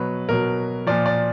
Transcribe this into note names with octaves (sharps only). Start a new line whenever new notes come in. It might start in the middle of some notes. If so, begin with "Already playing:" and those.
Already playing: B2 F#3 B4
B2 F#3 A#4
A#2 F3 D5
D5